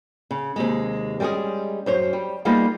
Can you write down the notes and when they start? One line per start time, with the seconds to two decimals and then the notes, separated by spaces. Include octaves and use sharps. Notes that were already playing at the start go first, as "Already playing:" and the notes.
0.31 C#3
0.56 D#2 C3 G#3
1.20 G3 G#3 C4 C#4 G#4
1.86 F#2 C5 C#5
2.13 G3
2.45 G3 A#3 B3 D#4 F4 G#4